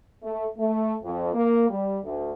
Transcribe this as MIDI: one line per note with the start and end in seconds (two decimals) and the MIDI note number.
0.23 0.46 57
0.58 0.95 57
1.03 1.32 41
1.34 1.68 58
1.70 1.98 55
2.04 2.31 38